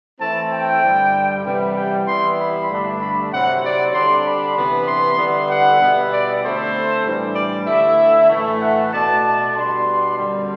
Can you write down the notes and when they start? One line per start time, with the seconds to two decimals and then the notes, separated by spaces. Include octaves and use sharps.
0.19 E3 A3 C4 E4 A5
0.50 G5
0.81 G2 D3 G3
1.43 C3 E3 G3 B3
1.75 G5
2.05 E3 G3 B3 E4 C6
2.37 B5
2.69 G2 D3 A3 D4
2.99 B5
3.31 C3 F#3 C4 E4 F#5
3.62 D5
3.93 D3 G3 D4 C6
4.24 B5
4.55 C3 E3 B3 D4
4.86 C6
5.17 D3 G3 B3 E4
5.49 F#5
5.80 B2 G3 B3 E4
6.11 D5
6.42 D3 A3 C4 E4 C5
7.04 A2 E3 G3 D4
7.35 D5
7.66 D3 A3 E4 E5
8.29 A2 E3 A3
8.60 F#5
8.91 B2 A3 D4 A5
9.54 B2 G3 D4 C6
10.17 F#2 D3 G3